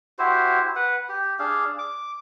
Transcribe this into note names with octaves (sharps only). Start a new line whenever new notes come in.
E4 F#4 G4 C5
B4 F#5
G4
D4 G#4 F5
D6